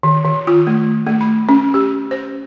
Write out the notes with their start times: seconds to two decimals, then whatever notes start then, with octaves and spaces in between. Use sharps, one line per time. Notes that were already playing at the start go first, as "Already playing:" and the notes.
0.03 D#3
0.25 D#3
0.47 F4
0.67 A3
1.07 A3
1.21 B5
1.49 C#4
1.74 G4
2.11 C5